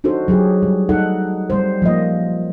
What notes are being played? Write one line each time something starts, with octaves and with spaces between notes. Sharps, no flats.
D4 D#4 F#4 A4 C5
F#3 G4 G#4
G3
D#4 A4 F#5
G3 C5
F3 A#3 D#5